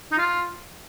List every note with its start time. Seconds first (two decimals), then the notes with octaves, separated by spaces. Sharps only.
0.12 D#4
0.18 F4